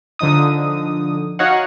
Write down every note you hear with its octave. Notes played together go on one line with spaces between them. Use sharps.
D3 F3 D#4 D#6
D#4 F#4 C#5 D#5 F5 F#5